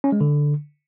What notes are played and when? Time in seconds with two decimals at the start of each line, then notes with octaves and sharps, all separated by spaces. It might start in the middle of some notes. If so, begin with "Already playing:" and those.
0.04 C#4
0.12 G#3
0.21 D3